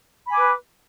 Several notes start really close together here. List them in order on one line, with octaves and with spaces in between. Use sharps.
B5 G#5 D6 B4